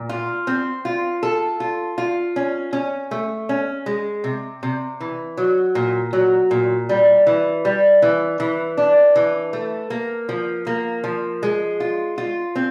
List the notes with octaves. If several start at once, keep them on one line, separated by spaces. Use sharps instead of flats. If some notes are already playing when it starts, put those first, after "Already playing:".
Already playing: A#2
F4
C4
F4
A4
F4
F4
C#4
C#4
A3
C#4
G#3
C3
C3
E3
F#3
A#2
F#3
A#2
G3
E3
G3
E3
E3
D4
E3
A3
A#3
F3
A#3
F3
G#3
F4
F4
C4